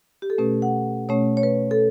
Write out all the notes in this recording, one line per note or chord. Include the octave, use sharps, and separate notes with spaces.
G4
A4
B2 A3 C#4 B4
F#5
B2 A3 C#4 C#5
C#5
B4
A4